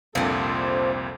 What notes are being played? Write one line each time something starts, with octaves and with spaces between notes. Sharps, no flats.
C2 F2 A#2 F3 C4 D4 A4